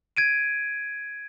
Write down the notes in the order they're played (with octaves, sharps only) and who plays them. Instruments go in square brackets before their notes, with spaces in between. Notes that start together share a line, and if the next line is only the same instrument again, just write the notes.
[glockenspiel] G#6 D7 D#7